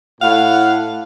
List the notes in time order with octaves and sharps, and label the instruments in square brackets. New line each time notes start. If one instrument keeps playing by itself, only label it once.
[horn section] A2 F#5 [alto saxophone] F5